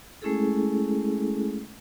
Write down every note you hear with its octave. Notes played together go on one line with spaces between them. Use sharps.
G#3 A3 C#4 E4 G#4 A4